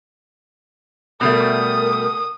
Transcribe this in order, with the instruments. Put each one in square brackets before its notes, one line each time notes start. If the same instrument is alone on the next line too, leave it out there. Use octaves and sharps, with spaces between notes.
[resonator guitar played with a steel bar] B2 G3 A3 [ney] A#4 [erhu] D#6